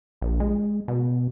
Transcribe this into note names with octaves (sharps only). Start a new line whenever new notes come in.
A#1
G#3
B2